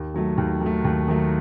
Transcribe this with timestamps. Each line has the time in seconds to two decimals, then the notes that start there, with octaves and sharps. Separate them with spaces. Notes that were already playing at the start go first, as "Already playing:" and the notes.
Already playing: D#2
0.14 D#3 F#3 A3
0.38 D#2
0.61 D#3 F#3 A3
0.84 D#2
1.08 D#3 F#3 A3